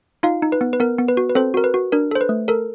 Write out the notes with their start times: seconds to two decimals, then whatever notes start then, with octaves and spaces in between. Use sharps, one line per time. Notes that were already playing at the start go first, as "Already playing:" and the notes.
0.23 D#4 F4 F5
0.42 D#4
0.52 B4
0.61 B3
0.73 B4
0.80 B3 A#4
0.99 B3
1.08 B4
1.17 F#4
1.29 B4
1.35 C4 A4 C5
1.54 F#4 A#4
1.64 B4
1.74 F#4
1.92 D4 A#4
2.11 A4 C5
2.21 B4
2.29 A3
2.48 A4 A#4